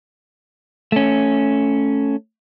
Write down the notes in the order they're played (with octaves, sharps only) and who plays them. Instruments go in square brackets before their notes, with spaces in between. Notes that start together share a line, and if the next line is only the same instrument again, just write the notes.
[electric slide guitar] A3 C#4